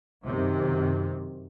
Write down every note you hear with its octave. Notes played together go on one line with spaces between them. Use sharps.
F#2 C3 D#3